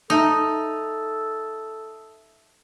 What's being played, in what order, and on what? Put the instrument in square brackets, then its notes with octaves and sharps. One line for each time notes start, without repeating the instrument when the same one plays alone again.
[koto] D#4 [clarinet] A4 [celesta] E5 A5 D#6